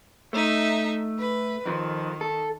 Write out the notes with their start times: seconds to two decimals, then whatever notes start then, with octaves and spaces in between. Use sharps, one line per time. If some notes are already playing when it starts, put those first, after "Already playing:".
0.33 A3 D#4 E5
1.19 B4
1.66 F2 D#3 F3
2.21 A4